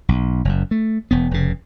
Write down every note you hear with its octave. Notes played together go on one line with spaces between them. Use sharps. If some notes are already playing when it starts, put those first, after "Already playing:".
B1
F#1 F#2
A3
E1 B3
F1 C#3